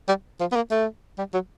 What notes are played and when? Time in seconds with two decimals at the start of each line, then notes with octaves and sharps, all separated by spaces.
0.08 G3
0.40 F3
0.52 B3
0.56 A#3
0.71 A3
1.18 G3
1.33 F#3